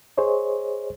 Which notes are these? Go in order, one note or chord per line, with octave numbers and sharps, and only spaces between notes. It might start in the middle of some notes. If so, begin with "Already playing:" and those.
G#4 C5 C#5 D#5